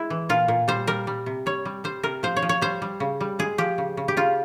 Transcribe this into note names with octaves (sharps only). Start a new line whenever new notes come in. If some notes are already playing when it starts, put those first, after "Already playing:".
Already playing: G#3 E4
E3
A#2 F4
A#2
G3 C5
G3 A#4
G3
C3
G3 C#5
G3
G3 C5
C3 A#4
F3 C5
C#5
F3
C#5
G3 C5
G3
C#3
G3
G#3 G#4
F3 G4
C#3
C#3
G4
C#3 F4